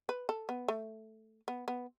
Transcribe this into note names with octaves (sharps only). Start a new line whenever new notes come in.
B4
A4
B3
A3
B3
B3